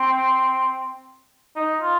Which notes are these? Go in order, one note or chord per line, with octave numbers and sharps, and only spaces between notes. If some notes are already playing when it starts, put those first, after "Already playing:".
Already playing: C4
D#4
F4